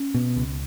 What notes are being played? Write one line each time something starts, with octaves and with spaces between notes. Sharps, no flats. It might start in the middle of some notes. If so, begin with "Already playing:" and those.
Already playing: C#4
B2
C#2